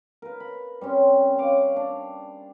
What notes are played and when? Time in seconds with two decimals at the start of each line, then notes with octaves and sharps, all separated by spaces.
0.22 A#4 B4
0.40 B5
0.81 G3 C4 C#4 C6
1.38 C#5 F5 D6
1.76 D4